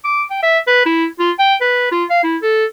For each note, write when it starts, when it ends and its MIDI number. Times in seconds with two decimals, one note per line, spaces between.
0.05 0.23 86
0.31 0.39 79
0.43 0.59 76
0.67 0.85 71
0.86 1.06 64
1.19 1.32 65
1.39 1.55 79
1.61 1.88 71
1.92 2.05 65
2.10 2.22 77
2.24 2.37 64
2.42 2.65 69